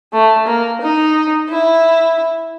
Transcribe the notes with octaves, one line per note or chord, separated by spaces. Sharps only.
A3
A#3
D#4
E4